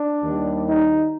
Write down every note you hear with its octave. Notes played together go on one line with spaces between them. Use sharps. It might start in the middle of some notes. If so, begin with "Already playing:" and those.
Already playing: D4
D#2 D#3 G3
D#4